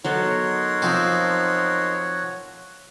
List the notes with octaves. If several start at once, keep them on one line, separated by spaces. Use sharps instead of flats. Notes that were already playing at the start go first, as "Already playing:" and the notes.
F#3 B3 D#4 A4 A#4 C#5 F#5 C6
F3 C4 C5 D6